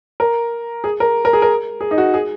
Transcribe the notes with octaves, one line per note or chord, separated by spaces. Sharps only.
A#4
G#4
A#4
A#4
G#4
A#4
G#4
D#4
F#4
G#4